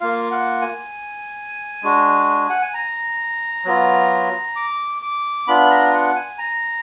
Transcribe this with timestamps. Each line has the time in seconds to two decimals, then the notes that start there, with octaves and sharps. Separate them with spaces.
0.01 A#3 F4 F5
0.31 F#5
0.62 G#5
1.83 G#3 D4 F#4
2.50 F#5
2.62 G#5
2.74 A#5
3.65 F#3 B3 F4
4.56 D6
5.02 D6
5.47 B3 D4 F4 B5
5.70 A#5
5.93 F#5
6.16 G#5
6.39 A#5